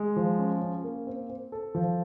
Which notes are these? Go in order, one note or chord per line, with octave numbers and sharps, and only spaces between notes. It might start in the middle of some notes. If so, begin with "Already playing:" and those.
Already playing: G#3
F3
C#4
C#4
A#3
C4
C4
A4
F3